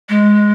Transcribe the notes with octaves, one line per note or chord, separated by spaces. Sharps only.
G#3